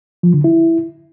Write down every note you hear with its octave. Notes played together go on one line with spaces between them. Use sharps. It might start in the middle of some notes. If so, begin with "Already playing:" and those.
F3
D3
E4